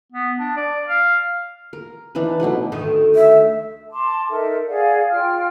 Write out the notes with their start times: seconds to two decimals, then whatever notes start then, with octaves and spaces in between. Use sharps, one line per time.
0.12 B3
0.39 D4
0.57 D5
0.87 F5
1.73 A#4
2.15 E3 D4 D#4 B4
2.40 B2 F#3 A3 B4
2.72 D2 D#3 A3
3.15 E5
3.91 A5 C6 D6
4.30 D#4 A4 A#4 E5
4.67 G#4 D5 F5 F#5
5.11 F4 G5 F6